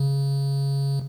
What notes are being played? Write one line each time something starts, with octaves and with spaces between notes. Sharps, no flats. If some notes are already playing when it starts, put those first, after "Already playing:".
Already playing: C#3